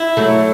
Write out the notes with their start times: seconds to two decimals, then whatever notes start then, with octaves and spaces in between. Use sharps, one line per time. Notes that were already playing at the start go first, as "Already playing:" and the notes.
Already playing: E4
0.17 F#3 A3